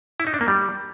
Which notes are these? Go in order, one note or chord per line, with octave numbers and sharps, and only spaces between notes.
E4
D#4
D4
A#3
G3